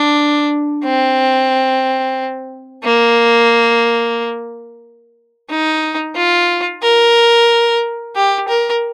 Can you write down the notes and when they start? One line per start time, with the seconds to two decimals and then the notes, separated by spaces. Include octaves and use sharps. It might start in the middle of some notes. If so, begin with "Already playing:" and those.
Already playing: D4
0.84 C4
2.84 A#3
5.50 D#4
6.16 F4
6.83 A#4
8.15 G4
8.48 A#4